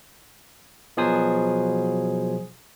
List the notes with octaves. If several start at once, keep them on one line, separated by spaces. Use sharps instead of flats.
B2 F3 F#3 G#4 C5 D#6